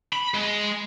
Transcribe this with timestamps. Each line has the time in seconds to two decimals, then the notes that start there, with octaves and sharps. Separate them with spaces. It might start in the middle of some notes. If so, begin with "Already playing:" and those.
0.13 B5
0.34 G#3